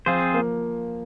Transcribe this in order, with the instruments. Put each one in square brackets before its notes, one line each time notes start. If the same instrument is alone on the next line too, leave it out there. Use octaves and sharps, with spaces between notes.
[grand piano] F3 [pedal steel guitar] C4 F4 G#4 C5
[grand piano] A#3